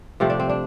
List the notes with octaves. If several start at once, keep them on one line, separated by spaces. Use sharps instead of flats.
C3 F3 A3 C4
D4
C4
D4